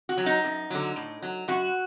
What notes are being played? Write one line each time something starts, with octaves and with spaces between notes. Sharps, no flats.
F#4
F#3
D#4
F#2
D3 F#3
A2
F#3
F#2 F#4